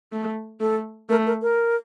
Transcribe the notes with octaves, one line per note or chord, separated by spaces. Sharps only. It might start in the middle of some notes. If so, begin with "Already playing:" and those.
A3
A3 A4
A3 A#4
A#4
A#4